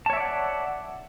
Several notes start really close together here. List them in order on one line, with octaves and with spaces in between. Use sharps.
A5 C#5 E5 D5 F#5